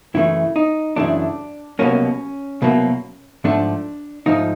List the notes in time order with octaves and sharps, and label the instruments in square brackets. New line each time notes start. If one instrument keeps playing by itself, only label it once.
[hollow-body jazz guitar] F#2 C#3 E3 A3 E4
D#4
F#2 C#3 E3 A3 D4
C2 B2 F#3 A#3 C#4
C2 B2 F#3 A#3
G#2 F3 A3 D4
G#2 F3 A3 D#4